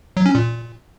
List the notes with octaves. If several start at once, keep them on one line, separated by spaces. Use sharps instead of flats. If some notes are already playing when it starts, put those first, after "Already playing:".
F#3
C#4
A#2